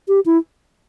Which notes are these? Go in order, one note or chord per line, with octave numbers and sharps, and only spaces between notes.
G4
E4